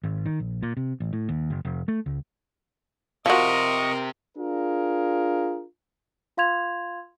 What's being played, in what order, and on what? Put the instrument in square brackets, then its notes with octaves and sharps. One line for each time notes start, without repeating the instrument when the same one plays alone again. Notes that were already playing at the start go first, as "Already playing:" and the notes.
[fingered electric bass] G#1
D#3
A#1
A#2
C3
A1
A2
D#2
F#1
F1
A3
C#2
[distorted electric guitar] C3 [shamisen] F3 F#4 [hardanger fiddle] A#4 [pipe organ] D#5 C#6 D#6
[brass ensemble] D4 F4 G#4 A#4
[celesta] F4 F5 C6 G#6 F7